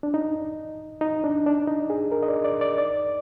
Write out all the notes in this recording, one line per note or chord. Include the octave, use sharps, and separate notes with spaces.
D4
D#4
D#4
D4
D4
D#4
G#4
A#4
D#5
D5
D5
D5
D5